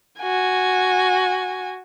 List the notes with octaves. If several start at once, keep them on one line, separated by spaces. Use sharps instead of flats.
F#4 G#5